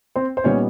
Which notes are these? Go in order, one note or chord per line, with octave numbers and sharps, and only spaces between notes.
C4 C5
C5
A#2 G3 B3 C#4 D#4 C#5